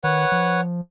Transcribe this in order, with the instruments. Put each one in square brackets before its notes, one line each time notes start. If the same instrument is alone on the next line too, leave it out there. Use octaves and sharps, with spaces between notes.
[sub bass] D#3 [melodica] B4 C#5 F#5
[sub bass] F3